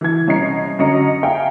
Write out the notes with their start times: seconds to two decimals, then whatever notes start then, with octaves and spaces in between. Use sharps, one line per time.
0.01 E3 G#6
0.27 C2 C#4 D#5 A#5 C7
0.79 F#2 D3 C#4 D#5 A#5 C#7
1.23 E5 F5 G5 G#5 A#5